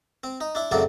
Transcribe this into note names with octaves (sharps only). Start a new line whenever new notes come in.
C4
D#4
D4 E4
F#2 A2 C#3 F#3 C4 D5